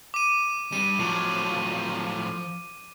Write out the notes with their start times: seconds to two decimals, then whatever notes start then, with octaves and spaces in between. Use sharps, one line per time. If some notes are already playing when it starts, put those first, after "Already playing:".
0.14 D6 D#7
0.73 G3 D4 D#7
1.00 A2 F3 F#3